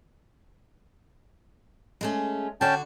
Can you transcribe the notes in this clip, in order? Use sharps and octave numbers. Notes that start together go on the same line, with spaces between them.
G#3 A3 C#4
D3 C#4 F#4 G5 A5